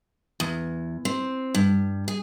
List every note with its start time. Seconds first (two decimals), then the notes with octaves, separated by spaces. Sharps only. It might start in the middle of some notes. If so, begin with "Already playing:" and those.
0.40 E2
1.05 C4
1.55 G2
2.08 G#4